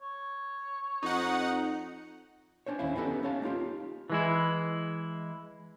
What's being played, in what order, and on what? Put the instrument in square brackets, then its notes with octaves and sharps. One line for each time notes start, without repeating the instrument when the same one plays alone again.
[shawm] C#5
[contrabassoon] F2 [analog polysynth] D#4 F#5
[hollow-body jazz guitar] C#4 D4 C5 C#5
D#2 D3 C#4 E4 F5
B3 C#4 D#4 G4 A4 B4
C#4 C#5 F5 A5
A#3 D#4 F4 G4
[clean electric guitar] E3 G#3 E4